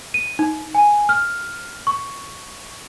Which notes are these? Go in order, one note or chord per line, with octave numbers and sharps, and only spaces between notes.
D#7
D#4
G#5
F6
C#6